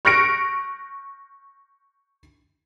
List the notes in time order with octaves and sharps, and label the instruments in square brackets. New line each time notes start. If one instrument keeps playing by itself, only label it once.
[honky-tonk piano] C#6 F6 F#6 A#6 C#7 D7